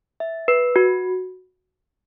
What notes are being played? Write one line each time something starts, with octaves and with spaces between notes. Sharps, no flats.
E5
B4
F#4